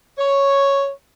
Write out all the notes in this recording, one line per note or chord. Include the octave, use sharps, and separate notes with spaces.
C#5